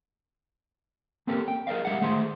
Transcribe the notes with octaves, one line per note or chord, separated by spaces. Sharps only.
A#3 C4 C#4 G4 A4 A#4
G5
G#4 A#4 D5 D#5 F5
G3 G#3 E5 F#5
D#3 A3 G#4 C5 C6